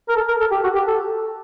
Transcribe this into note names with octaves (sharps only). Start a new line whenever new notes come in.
A#4
A4
A#4
A4
G4
F#4
G4
A4